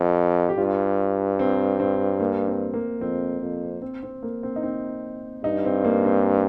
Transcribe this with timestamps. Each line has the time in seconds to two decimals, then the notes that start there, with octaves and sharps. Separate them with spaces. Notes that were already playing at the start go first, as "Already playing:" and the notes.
Already playing: F2
0.49 G4
0.58 G2 F4
1.39 C4
1.80 C4
2.20 A#3
2.47 C4
2.74 A#3
3.01 F2 C4
3.42 F2
3.82 C4
4.03 C4
4.23 A#3
4.43 C4
4.56 D#4
4.63 C4
5.44 G2 D#4
5.65 C4
5.84 A#3
6.05 C4